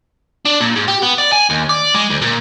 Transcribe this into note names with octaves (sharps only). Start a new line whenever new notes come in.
D4
A#2
G#2
G4
B3
D5
G#5
D#2
D5
G#3
D2
A#2